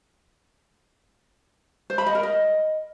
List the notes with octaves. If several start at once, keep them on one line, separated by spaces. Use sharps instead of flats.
C5
B5
D#5
A#4
D#5